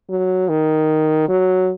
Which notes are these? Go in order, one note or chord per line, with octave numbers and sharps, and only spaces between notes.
F#3
D#3
F#3